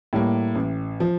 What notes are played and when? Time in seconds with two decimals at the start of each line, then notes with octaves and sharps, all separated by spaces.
0.13 A2 G3 A#3
0.55 A1
1.00 F3